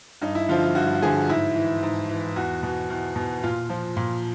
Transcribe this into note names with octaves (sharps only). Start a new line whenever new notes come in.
G2 D#4
E4
D3 F3 F4
F4
G2 F#4
D3 F3 G#4
G#2 E4
E3
G#2
E3
E2 F#4
B2
E2
B2
A#2 F4
F3
A#2